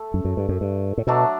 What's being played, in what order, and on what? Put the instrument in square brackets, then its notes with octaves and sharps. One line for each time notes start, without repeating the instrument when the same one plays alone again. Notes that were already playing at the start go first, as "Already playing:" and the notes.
Already playing: [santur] A3 A4
[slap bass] F#2
F#2
G2
F#2
G2
A2
[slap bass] B2 [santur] F#3 A3 D4 A4